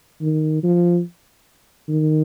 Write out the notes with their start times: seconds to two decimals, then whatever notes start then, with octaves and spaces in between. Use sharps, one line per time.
0.21 D#3
0.63 F3
1.89 D#3